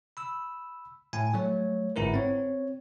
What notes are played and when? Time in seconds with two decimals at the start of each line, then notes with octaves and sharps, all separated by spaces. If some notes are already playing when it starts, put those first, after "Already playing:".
0.17 B5 E6
1.13 A2 G#5
1.34 F#3 A3 C#5
1.96 G1 G#2 E4 A#4 B4
2.14 C4 C#5